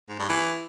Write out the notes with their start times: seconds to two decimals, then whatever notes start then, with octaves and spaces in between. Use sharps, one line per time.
0.09 G#2
0.19 G2
0.29 E3